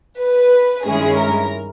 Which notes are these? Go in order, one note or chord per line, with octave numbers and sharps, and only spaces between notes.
B4
G2 D#3 G#3 C#4 E4 G#4
A#4